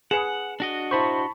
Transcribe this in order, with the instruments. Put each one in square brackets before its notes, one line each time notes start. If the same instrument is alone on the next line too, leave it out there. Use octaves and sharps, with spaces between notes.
[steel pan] G#4 B4 [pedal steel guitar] F#5 [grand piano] C#7 E7
[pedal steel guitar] D4 F#4 D#5
[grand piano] E4 C5 [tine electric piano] A5 B5 C#6